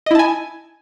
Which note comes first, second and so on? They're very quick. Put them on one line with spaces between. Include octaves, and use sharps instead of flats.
D#5 E4 A5 G#5